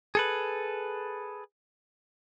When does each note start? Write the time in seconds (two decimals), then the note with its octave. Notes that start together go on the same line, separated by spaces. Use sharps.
0.15 G#4 A4 B4